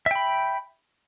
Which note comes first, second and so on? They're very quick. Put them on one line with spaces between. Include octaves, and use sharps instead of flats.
E5 G5 B5